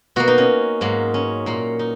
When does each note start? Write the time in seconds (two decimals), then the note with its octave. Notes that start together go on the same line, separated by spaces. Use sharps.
0.16 B2 A#3 F#4
0.27 D#4
0.38 C#4
0.81 G#2 F#3 A#3
1.14 C#4
1.46 A#2 A#3
1.79 D#4